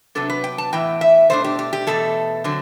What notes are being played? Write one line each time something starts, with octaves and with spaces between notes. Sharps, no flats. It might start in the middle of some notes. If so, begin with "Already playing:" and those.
C3 F#3 B3 D4 A4
B4
G5
A5
A2 E3 B3 E4 G5
E5
B2 A3 D4 C5
G4
G4
G4
E2 B2 A3 A4
D3 F#3 C4